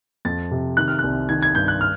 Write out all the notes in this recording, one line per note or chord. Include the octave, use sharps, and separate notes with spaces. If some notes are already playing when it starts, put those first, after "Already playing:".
F2 A6
C3
D#3 F#6
F6
C2 F#6
D#3 G#6
G#6
G2 G6
F#6
F6